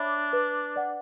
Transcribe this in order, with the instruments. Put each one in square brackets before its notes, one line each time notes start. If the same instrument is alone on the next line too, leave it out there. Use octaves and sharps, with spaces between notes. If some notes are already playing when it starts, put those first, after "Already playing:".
Already playing: [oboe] D4 [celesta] C#5 E5 B5 D6
[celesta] B4
D5 F#5